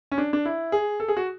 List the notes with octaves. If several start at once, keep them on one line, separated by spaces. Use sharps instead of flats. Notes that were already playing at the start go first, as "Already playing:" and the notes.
C#4
D4
D4
E4
G#4
A4
G#4
F#4